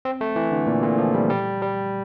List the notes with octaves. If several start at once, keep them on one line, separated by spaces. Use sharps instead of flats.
C4
A3
E3
D3
A#2
A#2
F3
G3
G3
G3